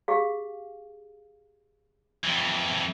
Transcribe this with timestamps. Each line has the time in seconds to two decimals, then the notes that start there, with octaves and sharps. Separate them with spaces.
0.08 G4 G#4 F5
2.24 F2 E3